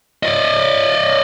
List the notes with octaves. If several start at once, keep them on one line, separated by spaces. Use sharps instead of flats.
D5 D#5